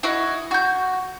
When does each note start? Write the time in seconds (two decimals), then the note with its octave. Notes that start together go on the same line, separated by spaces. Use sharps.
0.03 E4 F#4 D#5
0.51 F#4 G6